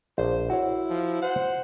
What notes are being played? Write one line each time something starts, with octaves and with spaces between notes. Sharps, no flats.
A#1 C5
E4 F#4 C#5
F3
C5 F#5